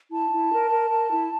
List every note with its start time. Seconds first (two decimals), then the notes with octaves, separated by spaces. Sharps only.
0.11 E4 A5
0.31 E4
0.51 A#4
0.71 A#4
0.91 A#4
1.11 E4